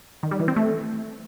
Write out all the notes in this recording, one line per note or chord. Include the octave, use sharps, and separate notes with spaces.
D#3
G3
E3
C4
A3